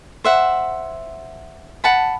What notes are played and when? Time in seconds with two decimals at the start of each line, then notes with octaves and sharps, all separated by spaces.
0.24 C5 E5 F#5
1.84 F#5 A5 B5